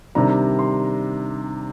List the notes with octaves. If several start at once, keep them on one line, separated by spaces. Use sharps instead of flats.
C3 D#3 G3 D4 A#5
C6